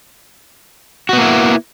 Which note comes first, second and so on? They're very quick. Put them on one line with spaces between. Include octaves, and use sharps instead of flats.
F#4 B3 A#3 E4